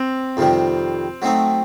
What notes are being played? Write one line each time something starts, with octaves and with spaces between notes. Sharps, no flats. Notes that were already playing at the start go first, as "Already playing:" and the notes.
Already playing: C4
F2 C3 D#3 G3
F#3 A3 C4 D#4